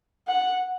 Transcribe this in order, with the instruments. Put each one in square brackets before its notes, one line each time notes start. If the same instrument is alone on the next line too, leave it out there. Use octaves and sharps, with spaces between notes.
[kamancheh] F#5